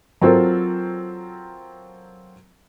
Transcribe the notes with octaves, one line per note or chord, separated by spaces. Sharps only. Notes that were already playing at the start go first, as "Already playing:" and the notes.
F#3 C4 F4 A4 A#4